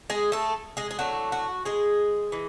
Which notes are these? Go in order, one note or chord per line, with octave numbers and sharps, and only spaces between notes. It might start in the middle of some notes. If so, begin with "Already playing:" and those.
G#3 G#4
A3 A4
G#3 G#4
G#4
A2 F#3 A3 D4 F#4
F#4
G#3 G#4
E3 G#3